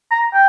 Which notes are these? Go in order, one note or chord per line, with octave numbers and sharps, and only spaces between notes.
A#5
G5